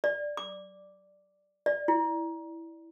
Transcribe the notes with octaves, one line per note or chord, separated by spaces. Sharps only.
D5
D6
D5
E4